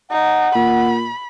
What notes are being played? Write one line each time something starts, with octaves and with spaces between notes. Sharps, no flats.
D#4 F#5
A#2 B5